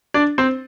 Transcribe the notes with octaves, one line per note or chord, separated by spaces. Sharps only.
D4 D5
C4 C5